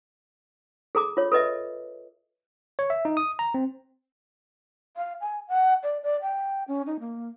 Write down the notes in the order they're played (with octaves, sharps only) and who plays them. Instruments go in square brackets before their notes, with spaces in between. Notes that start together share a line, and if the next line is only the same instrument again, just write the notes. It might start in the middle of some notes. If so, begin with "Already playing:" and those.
[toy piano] G#4 A4 A#5 D6
F4 C#5
A4 B4 D#5 E5
[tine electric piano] C#5
E5
D#4
D#6
A#5
C4
[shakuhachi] F5
G#5
F#5
D5
D5
G5
C#4
D#4
A#3